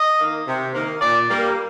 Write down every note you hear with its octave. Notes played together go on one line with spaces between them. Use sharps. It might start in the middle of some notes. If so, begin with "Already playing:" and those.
Already playing: D#5
D#3 A#3
C3
D#3 A#3
A#2 D5
G3 A#3